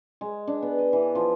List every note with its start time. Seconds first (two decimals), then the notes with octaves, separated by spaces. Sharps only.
0.21 G#3
0.47 D4
0.62 B3
0.79 D#5
0.93 E3
1.15 F3